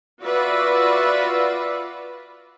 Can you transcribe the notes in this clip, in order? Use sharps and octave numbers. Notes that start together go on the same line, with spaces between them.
F4 F#4 B4 D5 E5